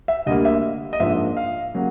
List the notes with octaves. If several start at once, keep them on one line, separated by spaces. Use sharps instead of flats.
E5
D2 D3 G3 A#3 D#5
E5
D#5
G#2 F3 A#3 D4 E5
F5
C#3 F#3 A#3